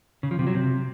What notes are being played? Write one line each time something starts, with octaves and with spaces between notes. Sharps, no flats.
C#3
F3
C3
F#3
C3